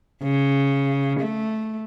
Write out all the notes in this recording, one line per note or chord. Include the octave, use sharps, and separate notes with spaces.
C#3
A3